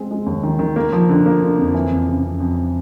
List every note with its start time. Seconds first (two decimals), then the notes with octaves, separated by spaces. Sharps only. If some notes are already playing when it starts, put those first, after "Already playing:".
Already playing: G#3 C4
0.11 G#3
0.26 D#2
0.43 D#3
0.59 D#3
0.76 A#3
0.92 F3
1.09 D3
1.26 A#3
1.42 D3
1.58 F2
1.74 E3
1.92 F2
2.07 C#3
2.24 F2
2.40 F2